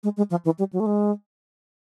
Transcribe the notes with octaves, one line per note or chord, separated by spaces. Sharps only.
G#3
G#3
F3
E3
G3
F#3
A3
G#3